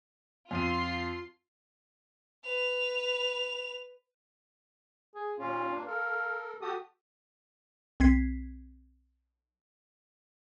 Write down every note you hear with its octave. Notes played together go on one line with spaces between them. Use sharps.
F2 F4 C6 D#7
B4 F7
G#4
D#2 A#2 C#4 F4
G2 A#3 D4
A4 A#4 F5
F#4 G4 A4 D#6
B1 C4 G#6 B6 C7